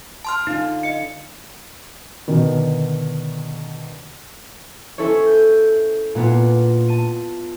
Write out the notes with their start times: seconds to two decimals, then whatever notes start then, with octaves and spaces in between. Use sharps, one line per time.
0.25 A5 C6 F6
0.47 D3 D#4 F4
0.83 D#5 C#7
2.28 B2 D3 D#3
4.98 C#4 E4 A4 C5 C#5
5.26 G6
6.15 A#2 B3 D4 F4
6.88 A5 D#7